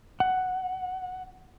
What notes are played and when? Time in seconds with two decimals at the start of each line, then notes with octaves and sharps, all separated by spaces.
0.20 F#5